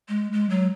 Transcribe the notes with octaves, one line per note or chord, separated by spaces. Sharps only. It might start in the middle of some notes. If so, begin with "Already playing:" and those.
G#3
G#3
F#3